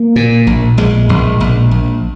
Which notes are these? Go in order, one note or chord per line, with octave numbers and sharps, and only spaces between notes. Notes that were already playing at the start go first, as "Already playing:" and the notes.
Already playing: A#3
A#2
A#1
A#1 G#3
A#1
A#1
A#1